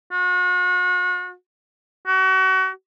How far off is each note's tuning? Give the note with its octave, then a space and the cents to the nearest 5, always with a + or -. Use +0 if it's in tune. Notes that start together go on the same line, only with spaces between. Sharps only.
F#4 -40
F#4 +35